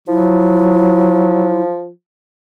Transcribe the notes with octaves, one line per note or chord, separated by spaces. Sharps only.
F3 F#3 E4